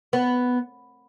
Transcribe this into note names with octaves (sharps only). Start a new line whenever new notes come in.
B3